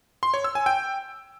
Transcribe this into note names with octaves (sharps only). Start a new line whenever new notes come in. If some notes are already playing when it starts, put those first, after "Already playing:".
C6
C#5
E6
G#5
G5